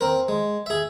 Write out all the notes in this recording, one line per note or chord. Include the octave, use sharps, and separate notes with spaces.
C4 A#4
G#3
G#4 E5